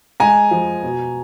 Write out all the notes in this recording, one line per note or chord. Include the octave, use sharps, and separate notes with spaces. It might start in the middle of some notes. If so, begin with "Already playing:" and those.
G#3 G#5 A#5
F3
B2